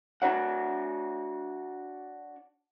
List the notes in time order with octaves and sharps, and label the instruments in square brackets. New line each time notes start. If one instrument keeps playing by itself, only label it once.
[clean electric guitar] D4 F#4 C#5 F#5